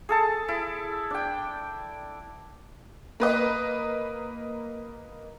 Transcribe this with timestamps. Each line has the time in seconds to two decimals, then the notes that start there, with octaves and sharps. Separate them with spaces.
0.09 G#4 A4 A5
0.48 E4
1.10 D4 G5
3.20 A#3 B4 D#5